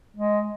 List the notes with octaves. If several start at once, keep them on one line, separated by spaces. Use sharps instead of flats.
G#3